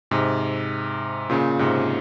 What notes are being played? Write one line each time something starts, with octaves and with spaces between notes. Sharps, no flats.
G#2 C3
A#2 C#3
G#2 C3